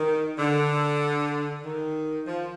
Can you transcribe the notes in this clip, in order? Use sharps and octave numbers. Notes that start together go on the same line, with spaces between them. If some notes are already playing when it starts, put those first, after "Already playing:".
Already playing: D#3
D3
D#3
F3